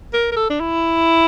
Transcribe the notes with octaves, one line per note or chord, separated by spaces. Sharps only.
A#4
A#4
A4
D4
E4